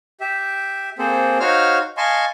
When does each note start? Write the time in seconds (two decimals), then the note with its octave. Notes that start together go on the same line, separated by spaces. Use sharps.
0.21 G4 E5
0.98 A#3 C4 G#4 A4 C5
1.40 D#4 F#4 C5 C#5 F5 F6
1.97 D#5 F5 G#5 A5 C6 C#6